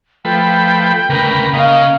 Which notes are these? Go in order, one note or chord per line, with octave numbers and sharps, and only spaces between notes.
F3 A3 B4 G5
D2 C#3 A#4 B4
C#3 A#3 D#5 F5